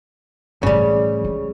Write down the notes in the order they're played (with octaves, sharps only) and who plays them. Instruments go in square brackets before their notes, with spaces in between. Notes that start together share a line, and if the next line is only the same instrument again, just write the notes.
[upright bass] A2 E3 [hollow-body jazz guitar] C#3 G3
[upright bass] G#3